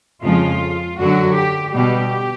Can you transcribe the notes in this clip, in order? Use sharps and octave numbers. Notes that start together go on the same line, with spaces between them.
F2 C#3 F3 G#3 F4
F#2 D3 F#3 F#4
G4
B2 G3 G4